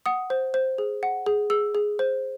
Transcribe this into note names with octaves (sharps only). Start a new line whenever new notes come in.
F#5 D#6
C5
C5
G#4
F#5
G#4
G#4 E6
G#4
C5